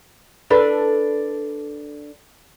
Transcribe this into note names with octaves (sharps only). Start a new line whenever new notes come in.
D4 A4 B4